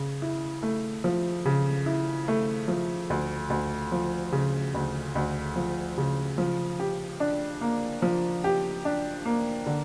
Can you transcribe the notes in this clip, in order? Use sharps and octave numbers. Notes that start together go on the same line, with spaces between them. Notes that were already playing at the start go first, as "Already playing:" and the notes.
Already playing: C#3
E4
A3
F3
C#3
E4
A3
F3
D2
D2
F3
C#3
D2
D2
F3
C#3
F3
G4
D4
A#3
F3
G4
D4
A#3
D3